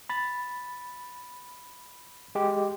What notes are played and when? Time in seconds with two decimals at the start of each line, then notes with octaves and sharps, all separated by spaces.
0.10 B5 A6
2.35 G#3 G4